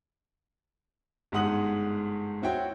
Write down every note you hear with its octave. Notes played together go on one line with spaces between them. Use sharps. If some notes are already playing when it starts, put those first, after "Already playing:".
G1 G#2 G#3 F#5 D#6 F#7
C4 E4 F#4 C#5 G5